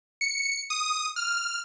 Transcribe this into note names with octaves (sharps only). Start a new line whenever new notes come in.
C#7
D#6
F6